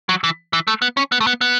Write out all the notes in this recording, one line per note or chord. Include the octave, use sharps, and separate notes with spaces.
F#3
E3
E3
A3
B3
C#4
B3
A3
B3
B3